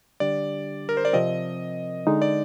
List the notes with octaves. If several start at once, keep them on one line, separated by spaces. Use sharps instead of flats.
D3 G3 D4 G4 D5
A#4
C5
D5
C3 F3 C4 D#5
D3 G#3 D#4
D5